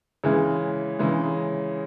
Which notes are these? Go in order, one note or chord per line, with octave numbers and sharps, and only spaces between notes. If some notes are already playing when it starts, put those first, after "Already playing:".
C#3 E3 G#3
C#3 E3 G#3